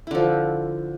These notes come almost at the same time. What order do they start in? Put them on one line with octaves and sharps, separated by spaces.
E4 D3 F3